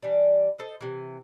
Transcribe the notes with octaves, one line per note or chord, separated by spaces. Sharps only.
E3 G3 D4
A4 C5 D#5
C3 E3